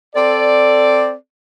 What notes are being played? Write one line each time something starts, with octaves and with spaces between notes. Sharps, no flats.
C4 A4 D5